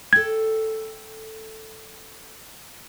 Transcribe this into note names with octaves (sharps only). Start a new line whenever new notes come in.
A4 G5 G#6